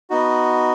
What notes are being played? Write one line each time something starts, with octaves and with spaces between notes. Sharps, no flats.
B3 D#4 F#4